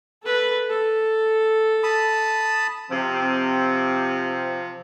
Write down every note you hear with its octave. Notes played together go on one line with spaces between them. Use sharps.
A4 B4
A4
A5 B5 D#6
C3 F3 C4